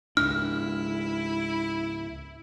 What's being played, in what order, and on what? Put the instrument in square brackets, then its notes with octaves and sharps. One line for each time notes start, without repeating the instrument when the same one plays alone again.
[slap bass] C#2 G#2 D4 [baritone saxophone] E4 [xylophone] F6